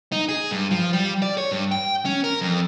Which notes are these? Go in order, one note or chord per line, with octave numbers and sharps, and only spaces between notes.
D#4
G#4
G2
F3
G3
D5
C#5
G2
G5
C#4
A#4
F2